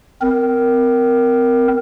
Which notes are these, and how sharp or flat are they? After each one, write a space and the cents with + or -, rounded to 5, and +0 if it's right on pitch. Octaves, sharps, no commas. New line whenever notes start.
C4 -30 A#4 +0